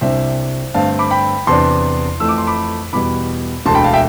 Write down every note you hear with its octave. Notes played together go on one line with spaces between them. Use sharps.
C2 C3 G3 D4 C5 E5
G2 D3 A3 C4 F5 A5
B5 D6
G5 B5
E2 C3 E3 B3 D4 A5 C6
F2 E3 A3 E6
D6
C6
B5 D6
E2 B2 G3 B5 D6
E1 D2 D3 A5 C6
G5 B5
F5 A5
E5 G5